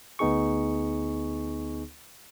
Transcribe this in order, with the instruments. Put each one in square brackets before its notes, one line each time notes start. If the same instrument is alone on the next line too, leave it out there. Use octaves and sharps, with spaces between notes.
[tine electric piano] D2 B3 D#4 G#4 C#6